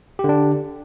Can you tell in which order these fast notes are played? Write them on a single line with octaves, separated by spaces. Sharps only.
G4 D3 D4